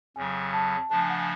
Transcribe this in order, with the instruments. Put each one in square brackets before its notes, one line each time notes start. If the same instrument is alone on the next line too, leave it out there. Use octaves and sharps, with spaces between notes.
[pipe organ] F2 C#3 F#3 [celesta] G#5
[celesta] A5
[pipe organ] C#3 F3 A3 D4 [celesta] A5
[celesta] G#5
F#5
G#5